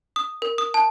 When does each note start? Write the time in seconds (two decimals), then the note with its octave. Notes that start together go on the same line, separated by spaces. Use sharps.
0.16 D#6
0.42 A#4
0.58 D#6
0.74 A5